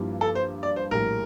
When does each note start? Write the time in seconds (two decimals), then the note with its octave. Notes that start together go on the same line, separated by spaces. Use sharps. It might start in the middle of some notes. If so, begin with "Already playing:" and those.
Already playing: G2 F3 A#3 E4 G4
0.21 A4
0.35 C5
0.63 D5
0.76 C5
0.91 A#1 A2 G3 A#4